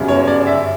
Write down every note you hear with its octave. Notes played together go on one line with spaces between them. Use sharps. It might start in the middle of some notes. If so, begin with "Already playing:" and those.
Already playing: G1 F#2 C#3 G3
C#5
D5
E5